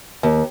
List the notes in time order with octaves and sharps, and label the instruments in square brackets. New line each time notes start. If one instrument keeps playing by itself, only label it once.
[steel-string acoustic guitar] D#2